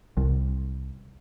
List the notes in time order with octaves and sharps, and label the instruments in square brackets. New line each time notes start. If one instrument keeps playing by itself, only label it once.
[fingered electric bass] C2